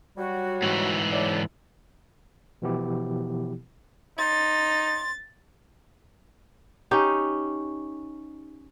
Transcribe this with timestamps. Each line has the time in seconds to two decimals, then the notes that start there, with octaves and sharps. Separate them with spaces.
0.17 F#3 G3 F#4
0.62 G#2 E3
1.12 A2 D5
2.62 B2 E3 F3 B3 E4 G4
4.19 D#4 C6 A6
6.91 C#4 D#4 G4